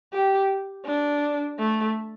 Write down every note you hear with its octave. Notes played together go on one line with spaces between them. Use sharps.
G4
D4
A3